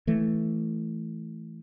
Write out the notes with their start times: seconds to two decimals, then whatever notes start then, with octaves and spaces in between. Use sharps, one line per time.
0.07 E3 A3